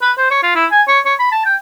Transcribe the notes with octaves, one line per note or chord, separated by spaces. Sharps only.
B4
C5
C#5
F4
E4
G#5
C#5
C#5
B5
A5
G5